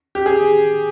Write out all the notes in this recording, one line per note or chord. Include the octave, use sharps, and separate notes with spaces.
G4
G#4